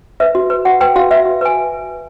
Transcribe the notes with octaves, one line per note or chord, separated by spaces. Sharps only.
B4 E5
F#4
B4
F#4 F#5
B4 G5
F#4 F5
B4 E5
F#4
B4 G#5